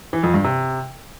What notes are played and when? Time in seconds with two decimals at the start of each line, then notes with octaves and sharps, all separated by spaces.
0.13 E3
0.23 F2
0.34 G2
0.45 C3